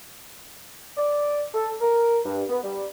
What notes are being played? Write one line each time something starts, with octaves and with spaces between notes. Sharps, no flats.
D5
A4
A#4
G2
B3
G3